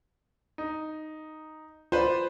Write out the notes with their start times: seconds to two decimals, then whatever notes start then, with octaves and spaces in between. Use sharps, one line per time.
0.58 D#4
1.92 F4 B4 C5 D5